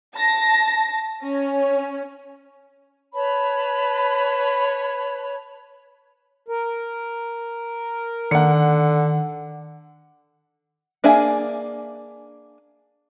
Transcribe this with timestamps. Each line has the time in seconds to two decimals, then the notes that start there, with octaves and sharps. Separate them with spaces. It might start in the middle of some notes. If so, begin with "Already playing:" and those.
0.14 A5 A#6
1.24 C#4
3.13 B4 C#5 A5 B5
6.48 A#4
8.31 D3 D#3 F#5 C#7
11.04 A#3 D4 G#4 E5 G#5